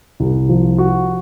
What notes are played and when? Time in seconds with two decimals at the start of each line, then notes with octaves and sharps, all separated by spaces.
0.20 C2
0.49 F3
0.78 F#4